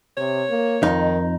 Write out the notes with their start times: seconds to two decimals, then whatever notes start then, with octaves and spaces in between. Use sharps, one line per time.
0.17 C3 C#5
0.50 A#3
0.83 F2 D#3 D#4